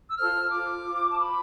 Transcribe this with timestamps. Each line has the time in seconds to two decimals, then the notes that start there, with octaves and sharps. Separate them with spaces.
0.10 E6
0.17 F4 A4 C5 F6
0.51 F4 A4 C5 D6
0.84 F4
0.89 C5
1.10 A5
1.18 F4 C5 B5